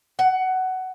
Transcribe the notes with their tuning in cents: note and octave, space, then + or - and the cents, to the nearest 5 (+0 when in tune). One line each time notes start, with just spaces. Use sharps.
F#5 +15